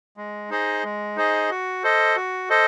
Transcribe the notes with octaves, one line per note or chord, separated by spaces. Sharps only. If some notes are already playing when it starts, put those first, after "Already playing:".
G#3
D#4 G#4 C5 D#5
G#3
D#4 G#4 C5 D#5
F#4
A4 C5 D#5
F#4
A4 C5 D#5